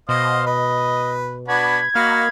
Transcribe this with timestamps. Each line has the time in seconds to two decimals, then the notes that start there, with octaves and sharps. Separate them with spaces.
0.09 B2 C5 D#5 F5
0.47 B4 D#5
1.48 B3 D4 F#4 B5 G#6
1.95 A#3 F#4 D#5 F5 B5